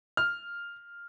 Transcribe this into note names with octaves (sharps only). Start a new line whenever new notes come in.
F6